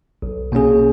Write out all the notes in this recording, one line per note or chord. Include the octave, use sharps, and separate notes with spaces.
B1
B2 A#3 C#4 G#4